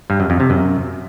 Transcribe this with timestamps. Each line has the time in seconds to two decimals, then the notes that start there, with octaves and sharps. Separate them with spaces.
0.10 G2
0.20 F#2
0.30 F2
0.40 C3
0.50 F#2